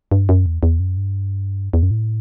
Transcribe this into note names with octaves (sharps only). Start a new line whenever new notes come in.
G2
F#2
E2
E2
F#2
G2
E2
F#2
A2